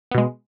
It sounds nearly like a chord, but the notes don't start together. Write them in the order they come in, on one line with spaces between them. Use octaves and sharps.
B3 B2 G#3